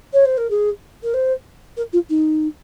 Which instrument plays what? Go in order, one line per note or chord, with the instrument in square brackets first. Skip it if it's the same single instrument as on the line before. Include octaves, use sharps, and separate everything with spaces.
[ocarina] C#5
C5
A#4
G#4
A#4
C5
A#4
F4
D#4